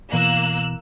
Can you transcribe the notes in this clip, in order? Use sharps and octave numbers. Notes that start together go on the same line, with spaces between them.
B2 E3 A#3 E6 F#6